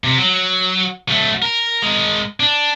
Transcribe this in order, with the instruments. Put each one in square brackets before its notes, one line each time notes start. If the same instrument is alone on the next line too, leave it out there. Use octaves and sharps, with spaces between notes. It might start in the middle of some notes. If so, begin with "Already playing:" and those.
[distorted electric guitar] C3
F#3
F#3 A3
A#4
G#3 A#4
D4